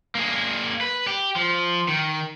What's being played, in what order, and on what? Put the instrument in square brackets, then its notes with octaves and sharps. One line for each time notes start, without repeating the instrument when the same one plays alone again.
[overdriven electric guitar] A#3 G#4
B4
G4
F3
D#3